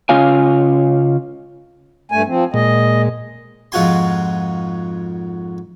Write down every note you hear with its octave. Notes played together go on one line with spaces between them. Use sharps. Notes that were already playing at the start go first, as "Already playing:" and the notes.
C#3 C#4 F4 F5 G#5
G2 A3 G#5
F3 C4
A#2 G#3 D#5
F2 G#2 F4 F#4 G#5 C6